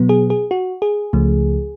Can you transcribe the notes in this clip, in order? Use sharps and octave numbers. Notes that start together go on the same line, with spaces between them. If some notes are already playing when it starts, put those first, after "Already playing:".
Already playing: B2 F#3 B3
G#4
G#4
F#4
G#4
C#2 C#3 F3 A3